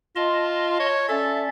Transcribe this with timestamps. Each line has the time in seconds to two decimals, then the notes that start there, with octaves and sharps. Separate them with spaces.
0.16 F4 D#5 A5 C6
0.80 C#5
1.09 C#4 A4 D5 E5